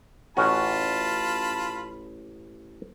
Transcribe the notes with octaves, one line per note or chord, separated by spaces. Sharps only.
A1 C#4 F4 F#4 A5 B5